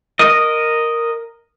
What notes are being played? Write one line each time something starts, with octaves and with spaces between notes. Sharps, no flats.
A#4 D#5